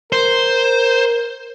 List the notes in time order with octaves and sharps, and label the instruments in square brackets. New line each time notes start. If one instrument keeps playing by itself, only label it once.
[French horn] A#4 [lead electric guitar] C5